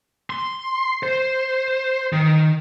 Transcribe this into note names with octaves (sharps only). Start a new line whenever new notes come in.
C6
C5
D#3